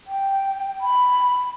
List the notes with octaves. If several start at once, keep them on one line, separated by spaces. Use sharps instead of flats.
G5
B5